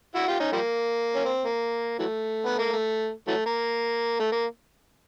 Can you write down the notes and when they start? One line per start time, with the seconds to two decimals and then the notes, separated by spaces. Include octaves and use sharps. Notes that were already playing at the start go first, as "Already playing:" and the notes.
0.15 E4 F#4
0.28 F4 G4
0.40 C#4 D#4
0.53 F3 G3 A#3
1.15 C#4
1.25 C4
1.45 A#3
1.99 E3 F#3 A3
2.46 B3
2.59 A#3
2.73 A3
3.28 E3 F#3 A3
3.46 A#3
4.19 A3
4.32 A#3